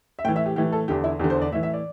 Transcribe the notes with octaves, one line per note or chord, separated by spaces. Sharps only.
E5
A2 E3 G5
E5
G4
A2 E3 G4
A4
E2 D3 G4
E4
E2 D3 G4
C5
D5
A2 E3 E5
E5
D5